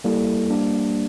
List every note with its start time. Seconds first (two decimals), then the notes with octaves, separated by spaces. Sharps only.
0.04 G3 A#3 E4 A4
0.50 G3 A#3 D4